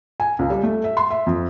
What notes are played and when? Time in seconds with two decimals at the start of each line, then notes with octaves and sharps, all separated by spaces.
0.20 G#5
0.39 C#2
0.50 G3
0.63 A3
0.84 E5
0.97 C6
1.11 E5
1.26 F2